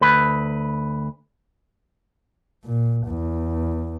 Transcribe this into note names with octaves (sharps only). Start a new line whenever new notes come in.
D2 B4
A#2
E2